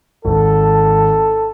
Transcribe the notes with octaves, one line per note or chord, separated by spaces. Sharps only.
G#1 A4